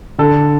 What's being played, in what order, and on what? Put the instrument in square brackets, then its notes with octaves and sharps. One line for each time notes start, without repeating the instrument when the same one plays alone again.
[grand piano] D3 A4